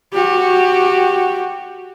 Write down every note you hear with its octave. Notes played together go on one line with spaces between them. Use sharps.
F#4 G4